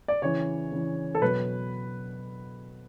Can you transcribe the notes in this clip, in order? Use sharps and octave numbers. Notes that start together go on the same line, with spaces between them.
D5
C#3 E3 C#5
C#3 E3
A4
B2 F#3 B4